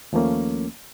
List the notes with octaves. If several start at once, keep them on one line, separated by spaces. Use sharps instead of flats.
D#2 F3 A3 A#3 C#4